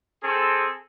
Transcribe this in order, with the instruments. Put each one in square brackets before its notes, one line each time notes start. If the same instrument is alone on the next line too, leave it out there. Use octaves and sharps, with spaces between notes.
[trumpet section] C4 G#4 A4